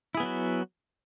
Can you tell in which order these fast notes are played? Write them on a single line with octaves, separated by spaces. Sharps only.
E4 G#4 B3 F#3 F#4